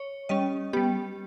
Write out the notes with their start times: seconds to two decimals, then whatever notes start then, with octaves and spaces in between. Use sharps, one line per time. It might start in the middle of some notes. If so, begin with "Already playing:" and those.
Already playing: C#5
0.29 G3 C#4 D#5
0.73 G3 B3 G4